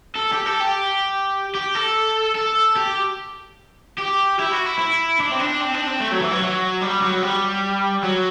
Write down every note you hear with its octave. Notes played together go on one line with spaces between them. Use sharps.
A4
G4
A4
G4
G4
A4
A4
G4
G4
E4
F#4
E4
E4
D4
C4
D4
C4
D4
C4
A3
F#3
E3
F#3
F#3
G3
F#3
G3
F#3